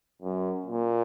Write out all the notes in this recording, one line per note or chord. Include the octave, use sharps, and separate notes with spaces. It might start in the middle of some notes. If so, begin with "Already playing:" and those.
F#2
A#2